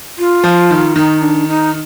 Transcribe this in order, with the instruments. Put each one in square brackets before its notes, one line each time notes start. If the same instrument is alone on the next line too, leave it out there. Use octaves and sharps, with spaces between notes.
[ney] F4
[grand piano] F3
D#3
[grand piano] D#3 [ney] D#4
[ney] D4
D#4